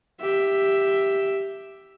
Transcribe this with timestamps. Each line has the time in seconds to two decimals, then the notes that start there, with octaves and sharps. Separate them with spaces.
0.21 G4 E5